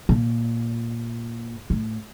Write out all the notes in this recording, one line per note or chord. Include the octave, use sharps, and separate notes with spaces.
A#2
A2